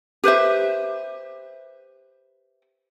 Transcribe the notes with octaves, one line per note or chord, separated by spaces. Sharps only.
G4 B4 C5 E5